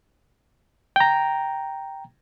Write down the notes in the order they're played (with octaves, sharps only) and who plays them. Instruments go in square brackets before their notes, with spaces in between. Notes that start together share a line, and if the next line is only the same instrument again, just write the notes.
[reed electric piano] G5 A#5